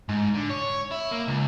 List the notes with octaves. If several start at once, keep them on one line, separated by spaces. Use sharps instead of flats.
G#2
D3
C#5
E4
A#3
C#2